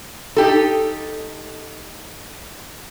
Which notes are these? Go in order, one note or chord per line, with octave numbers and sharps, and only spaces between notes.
D#4 G4 A4